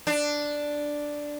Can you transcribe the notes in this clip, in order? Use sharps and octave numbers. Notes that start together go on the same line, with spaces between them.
D4